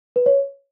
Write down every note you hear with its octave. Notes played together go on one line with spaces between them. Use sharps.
B4
C#5